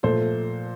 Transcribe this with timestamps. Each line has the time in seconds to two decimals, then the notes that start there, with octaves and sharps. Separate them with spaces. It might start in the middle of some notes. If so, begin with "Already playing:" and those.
0.03 A#2 F3 A3 A4 C5